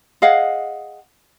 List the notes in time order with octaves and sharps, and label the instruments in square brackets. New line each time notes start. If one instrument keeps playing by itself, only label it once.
[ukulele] G#4 D#5 F5 F#5